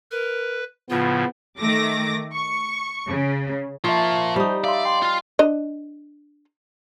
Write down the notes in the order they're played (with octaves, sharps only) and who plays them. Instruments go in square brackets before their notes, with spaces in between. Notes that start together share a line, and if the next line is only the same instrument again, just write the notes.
[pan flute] A#4 [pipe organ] B4
[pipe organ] A2 C#3 F3 [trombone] B3 [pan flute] F4
[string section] D#3 A3 D6 A#6
C#6
C#3
[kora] F3 [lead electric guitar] A#3 F4 [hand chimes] E5 A5 C#6
[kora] G3 D#4 [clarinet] C5
[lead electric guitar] D5 [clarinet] E5 [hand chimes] F5 C6
[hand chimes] G5 [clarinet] C6
[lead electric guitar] F4 F5
[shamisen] D4 D#5